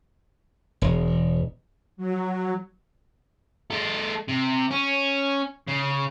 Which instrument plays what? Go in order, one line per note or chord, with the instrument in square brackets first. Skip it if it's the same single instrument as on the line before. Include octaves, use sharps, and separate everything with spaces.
[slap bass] E1
[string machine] F#3
[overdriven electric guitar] G#3 A4
C3
C#4
C#3